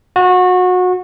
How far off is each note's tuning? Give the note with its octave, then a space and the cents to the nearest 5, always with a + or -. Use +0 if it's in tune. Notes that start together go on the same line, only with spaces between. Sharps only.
F#4 -25